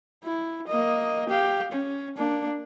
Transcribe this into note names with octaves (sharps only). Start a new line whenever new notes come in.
E4
A#3 D#5
G4 F5
C#4
A#3 D4